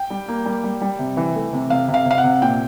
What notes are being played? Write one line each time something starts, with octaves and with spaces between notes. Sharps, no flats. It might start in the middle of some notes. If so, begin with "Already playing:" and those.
Already playing: G5
G3
A#3
G3
G3
G3
C3
E3
A3
C3
C3 F5
C3
F5
C3 F5
F#5
C3
A#2 G5